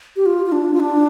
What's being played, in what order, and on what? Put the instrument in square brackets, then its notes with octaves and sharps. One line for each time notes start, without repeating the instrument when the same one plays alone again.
[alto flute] G4
F4
F4
D4
F4
D4